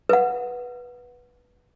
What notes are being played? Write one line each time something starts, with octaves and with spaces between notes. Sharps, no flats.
B4 F#5